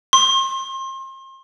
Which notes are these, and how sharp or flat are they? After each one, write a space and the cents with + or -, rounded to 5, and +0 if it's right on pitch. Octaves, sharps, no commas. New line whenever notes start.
C6 +35